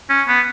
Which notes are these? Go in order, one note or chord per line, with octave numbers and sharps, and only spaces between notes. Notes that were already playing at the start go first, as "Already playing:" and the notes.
C#4
B3